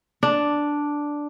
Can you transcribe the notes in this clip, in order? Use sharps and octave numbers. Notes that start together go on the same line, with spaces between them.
D4